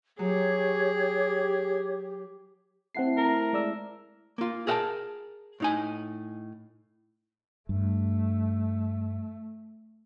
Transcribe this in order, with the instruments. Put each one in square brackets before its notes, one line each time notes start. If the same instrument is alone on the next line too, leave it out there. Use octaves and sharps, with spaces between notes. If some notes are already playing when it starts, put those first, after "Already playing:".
[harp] F#3 [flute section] G4 [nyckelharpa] G#4 [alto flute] C#5
[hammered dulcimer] A3 E4 A4 [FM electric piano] C4 F#5 C7
[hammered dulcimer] C3 [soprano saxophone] A#4
[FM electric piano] G#3 D5 E6
[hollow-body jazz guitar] A#3 F4
G#4 A#4 E5 F#5 G5 A5
A2 D#4 G#5
[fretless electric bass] G2 [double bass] A3